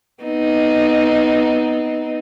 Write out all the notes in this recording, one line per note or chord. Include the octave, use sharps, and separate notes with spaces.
B3 C4 D#4